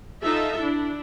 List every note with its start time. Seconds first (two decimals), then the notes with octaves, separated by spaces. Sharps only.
0.22 D#4 F4 A4 E5
0.60 D4 E4